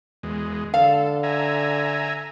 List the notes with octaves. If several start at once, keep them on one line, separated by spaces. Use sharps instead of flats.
E2 G#3
D3 A4 F5
E5 G#5 A#5